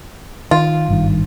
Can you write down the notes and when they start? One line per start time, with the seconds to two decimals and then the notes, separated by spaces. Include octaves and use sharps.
0.51 D#3 F4
0.89 G#1 G2 D#3